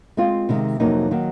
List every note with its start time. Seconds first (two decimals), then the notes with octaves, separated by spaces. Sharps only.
0.17 G#3 C4 F4
0.49 C3 D#3 G#3
0.80 F2 C3 F#3 A#3 D#4
1.11 D#3 F#3 A#3